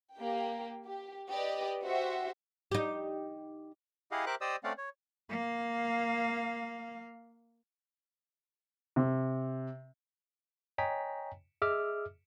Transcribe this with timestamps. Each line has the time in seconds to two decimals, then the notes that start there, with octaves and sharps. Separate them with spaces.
0.16 A#3 G4 G5
0.86 G4
1.29 G4 B4 D5 D#5
1.84 F#4 G4 C5 E5 F#5
2.72 D#4 G4
4.11 E4 G4 G#4 D#5 F5 F#5
4.26 G4 A#4 C5 E5 D6 F#6
4.41 G4 C5 D5 D#5 D#6 E6
4.64 A3 C4 C#4 D5 F5 F#5
4.78 C#5
5.30 A#3 F5
8.96 C3
10.78 C#5 D#5 G5 G#5 A#5 B6
11.62 G#4 D#5 E5 D6 E6 F6